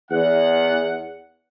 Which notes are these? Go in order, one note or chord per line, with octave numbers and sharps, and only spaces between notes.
E2 F#5